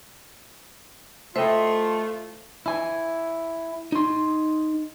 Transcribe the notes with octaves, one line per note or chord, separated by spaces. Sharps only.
A3 E4 F4 C5 D#5 E5 G5
E4 G#5
D#4 C6